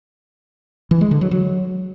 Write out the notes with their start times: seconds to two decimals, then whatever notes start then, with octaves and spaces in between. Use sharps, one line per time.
0.91 E3
1.01 G#3
1.11 D3
1.21 F#3
1.31 F#3